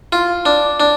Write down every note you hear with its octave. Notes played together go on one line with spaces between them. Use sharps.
F4
D4
D4